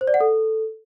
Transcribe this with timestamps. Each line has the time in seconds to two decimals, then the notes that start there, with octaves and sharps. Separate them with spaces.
0.01 C5
0.07 D5
0.14 F#5
0.21 A4